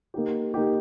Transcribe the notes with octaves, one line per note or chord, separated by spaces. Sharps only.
A#3 D#4 G4
A#3 D#4 G4